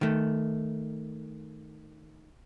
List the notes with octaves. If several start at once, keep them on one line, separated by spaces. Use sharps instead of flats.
D#3 A3